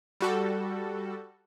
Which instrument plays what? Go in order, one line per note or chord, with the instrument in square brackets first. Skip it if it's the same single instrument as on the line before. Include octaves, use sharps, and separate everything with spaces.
[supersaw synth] G3 F#4 A4